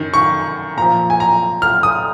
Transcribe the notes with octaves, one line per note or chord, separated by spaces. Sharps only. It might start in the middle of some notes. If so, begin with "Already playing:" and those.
Already playing: F#2 D#3
C#6
A#2 F3 A#5
G#5
A#5
F6
D#6